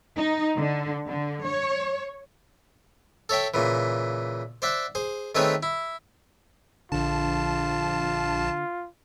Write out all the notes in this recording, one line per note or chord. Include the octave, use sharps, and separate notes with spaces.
D#4
D3
D3
C#5
A4 C#5 E5 G5
A#2 C#3 E3
C5 D5 E5 F#5
G#4 C5
D#3 A3 C4 G#4 B4 C#5
E4
A#1 D3 F4 A5